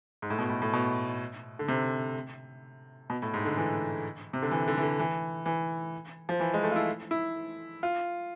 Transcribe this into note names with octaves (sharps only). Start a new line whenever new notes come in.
G#2
A2
B2
A2
A2
B2
D3
C3
B2
A2
G#2
D3
E3
C3
D3
E3
D3
E3
D3
E3
E3
F3
E3
G#3
A3
F4
E4
E4
F4